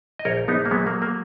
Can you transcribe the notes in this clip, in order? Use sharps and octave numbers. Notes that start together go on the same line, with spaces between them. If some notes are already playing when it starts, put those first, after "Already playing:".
D#5
A#1 A#4 C#5
A#1 B3 D#4
A#3
F#3 G#3 B3
A#3
F#3
A#3